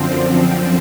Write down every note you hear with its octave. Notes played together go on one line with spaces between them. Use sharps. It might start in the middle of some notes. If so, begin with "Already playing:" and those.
Already playing: F#2 D3 F3 C4